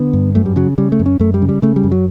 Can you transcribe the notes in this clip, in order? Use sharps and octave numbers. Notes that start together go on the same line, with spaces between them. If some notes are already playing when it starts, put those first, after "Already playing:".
Already playing: D3 B3
G2
F#2 A3
G3
C#3 F#3
C#3 G3
A3
F#2
C#4
F#2 A3
G3
C#3
G3
C#3 A3
G3
F#2
F#3